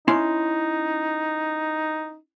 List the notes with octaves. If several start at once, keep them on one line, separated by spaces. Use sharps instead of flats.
C#4 D#4 E4 C6